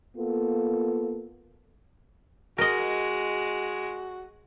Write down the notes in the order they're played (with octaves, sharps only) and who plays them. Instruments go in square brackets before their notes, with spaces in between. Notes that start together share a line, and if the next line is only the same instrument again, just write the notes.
[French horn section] A#3 B3 F4 A4
[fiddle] G#3 [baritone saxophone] F#4 [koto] A#4 D#5